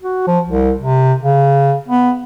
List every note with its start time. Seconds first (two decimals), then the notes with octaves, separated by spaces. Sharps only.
0.03 F#4
0.27 F3
0.48 C2
0.80 C3
1.23 C#3
1.88 B3